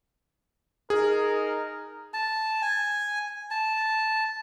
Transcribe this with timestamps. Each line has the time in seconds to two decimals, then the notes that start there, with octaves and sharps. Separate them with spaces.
0.90 D#4 G#4 A#4
2.14 A5
2.62 G#5
3.51 A5